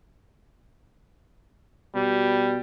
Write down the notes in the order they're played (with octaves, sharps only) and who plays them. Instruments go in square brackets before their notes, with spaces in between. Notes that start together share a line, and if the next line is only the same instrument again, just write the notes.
[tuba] B2 [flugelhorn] G3